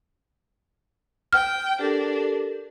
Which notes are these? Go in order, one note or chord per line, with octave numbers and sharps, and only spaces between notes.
G5 F6
D4 G4 A4 A#4